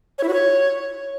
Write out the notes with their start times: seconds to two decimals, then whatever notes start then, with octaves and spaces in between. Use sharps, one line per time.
0.18 C#5
0.23 E4
0.28 F#4
0.33 C#5